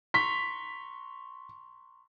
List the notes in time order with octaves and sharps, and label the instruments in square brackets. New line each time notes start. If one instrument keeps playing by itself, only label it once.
[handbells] A#5 C6 C#6 [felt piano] B6